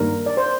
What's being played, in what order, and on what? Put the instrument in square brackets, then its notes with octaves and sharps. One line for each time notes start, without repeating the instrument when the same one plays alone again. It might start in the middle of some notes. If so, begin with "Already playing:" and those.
Already playing: [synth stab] G2 D#3 G3 A#3 D4 [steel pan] A#4
[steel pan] D5
C5